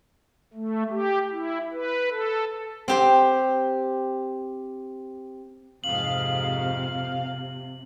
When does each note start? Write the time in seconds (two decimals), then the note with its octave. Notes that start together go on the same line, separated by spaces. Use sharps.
0.54 A3
0.90 G4
1.32 E4
1.73 B4
2.10 A4
2.88 C4 G4 C5
5.84 F2 G#2 C3 F5 F#7